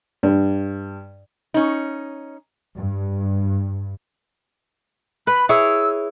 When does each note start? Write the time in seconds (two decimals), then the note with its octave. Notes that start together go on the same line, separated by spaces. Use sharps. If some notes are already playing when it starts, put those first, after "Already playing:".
0.23 G2
1.54 C#4 D#4
2.75 G2
5.27 B4 B5
5.49 E4 G#4 C#5 E6